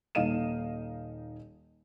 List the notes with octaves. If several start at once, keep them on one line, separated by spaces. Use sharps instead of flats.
D#1 D#4 D#5 F5 D#7 E7